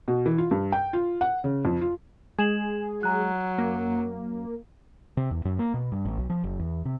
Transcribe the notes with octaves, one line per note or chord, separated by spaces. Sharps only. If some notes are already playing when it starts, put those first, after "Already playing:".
B2
E3
F4
G2
G5
F4
F#5
C#3
F2
F4
G#3 G#4 G#6 E7 F#7
F#3 F#5 A#5 F#6
F#2 A#3
C3
E2
F#2
A#3
B2
G2
A1
B1
F3
F#1
E2
C3